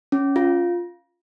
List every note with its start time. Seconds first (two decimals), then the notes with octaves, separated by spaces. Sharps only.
0.12 C#4
0.36 F4